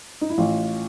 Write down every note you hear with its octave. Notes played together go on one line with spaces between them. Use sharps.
D#4
E4
A1 F4